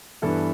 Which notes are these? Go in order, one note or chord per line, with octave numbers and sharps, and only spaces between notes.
G2 E3 B3 E4 A4